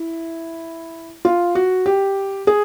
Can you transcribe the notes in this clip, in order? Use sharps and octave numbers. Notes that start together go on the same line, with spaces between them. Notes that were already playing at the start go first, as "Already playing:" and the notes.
Already playing: E4
F4
F#4
G4
G#4